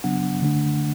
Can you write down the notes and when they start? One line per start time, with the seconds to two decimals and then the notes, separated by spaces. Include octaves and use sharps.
0.04 C#3 F#3 B3 D4 F#5
0.42 D3 A3 D4